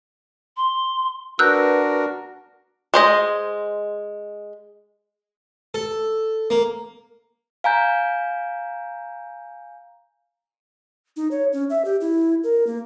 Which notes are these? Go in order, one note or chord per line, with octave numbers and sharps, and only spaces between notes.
C6
D4 F#4 A#4 B4 E6 F#6 G6
G#3 C5 D#5
A4
A#3
F5 G#5 A#5 G6
D#4
C#5
C#4
E5
G4
E4
A#4
A#3